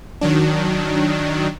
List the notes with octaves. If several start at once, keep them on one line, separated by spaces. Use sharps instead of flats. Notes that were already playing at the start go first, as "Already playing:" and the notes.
D#3 F#3 D4